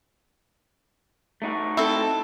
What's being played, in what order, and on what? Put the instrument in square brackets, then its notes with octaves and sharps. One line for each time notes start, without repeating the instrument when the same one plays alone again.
[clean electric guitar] A3 D#4 F#4
[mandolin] C4 A4 [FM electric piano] E4